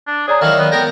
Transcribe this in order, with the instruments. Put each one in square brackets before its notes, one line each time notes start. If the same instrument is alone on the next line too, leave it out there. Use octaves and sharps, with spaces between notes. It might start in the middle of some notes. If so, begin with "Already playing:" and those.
[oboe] D4
[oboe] G#4 [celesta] C#5 D5 A#5
[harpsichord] D#3 F#3 E4 [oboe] F5
[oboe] B3
[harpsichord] B3 A#4 A#5 [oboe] G5